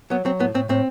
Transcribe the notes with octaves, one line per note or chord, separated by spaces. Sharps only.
F#3 B3
F#3 C4
A2 B3
A2 C4
A2 C4